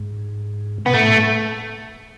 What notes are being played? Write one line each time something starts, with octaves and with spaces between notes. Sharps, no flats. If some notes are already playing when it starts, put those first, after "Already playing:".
Already playing: G#2
B2 B3
A2 A3